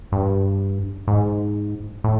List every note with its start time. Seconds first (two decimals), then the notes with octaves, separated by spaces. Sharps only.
0.12 G2
1.07 G#2
2.04 A2